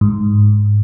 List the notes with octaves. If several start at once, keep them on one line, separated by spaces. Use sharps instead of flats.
G#2